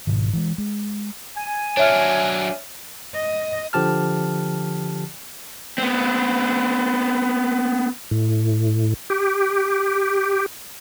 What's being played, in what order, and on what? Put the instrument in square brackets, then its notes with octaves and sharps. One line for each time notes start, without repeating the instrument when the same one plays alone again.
[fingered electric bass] G#2 B2 D#3
E3 F#3 G#3
G#3
[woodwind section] G#5
[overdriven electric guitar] F#3 D4 [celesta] C#5 E5 F6
[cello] D#5
[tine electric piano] D3 F3 G4 A5 F6
[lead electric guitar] B3 C4
[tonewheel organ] A2
G4